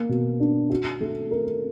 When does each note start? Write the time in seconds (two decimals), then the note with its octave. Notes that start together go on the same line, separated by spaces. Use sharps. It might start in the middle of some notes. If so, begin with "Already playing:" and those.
Already playing: A#3
0.09 B2
0.40 D4
0.70 F#4
1.01 A3
1.31 A#4